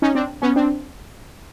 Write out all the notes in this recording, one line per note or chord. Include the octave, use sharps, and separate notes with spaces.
C#4 D#4
C4 D4
B3 C#4
C4 D4